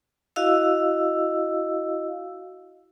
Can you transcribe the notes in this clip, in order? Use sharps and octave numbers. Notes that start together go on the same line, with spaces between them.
E4 F#4 D#5 F5 E6